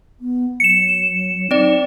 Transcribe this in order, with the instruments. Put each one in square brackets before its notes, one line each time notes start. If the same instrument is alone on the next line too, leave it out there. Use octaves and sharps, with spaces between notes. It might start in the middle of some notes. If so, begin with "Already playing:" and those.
[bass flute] B3
[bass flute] F#3 [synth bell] C#7 E7
[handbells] C4 D5 [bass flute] D#4